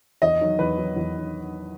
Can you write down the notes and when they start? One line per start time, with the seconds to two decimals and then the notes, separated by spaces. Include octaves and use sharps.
0.22 E2 D#5
0.41 D#3 F#3
0.59 E2 B4
0.78 D#3 F#3
0.96 E2
1.15 D#3 F#3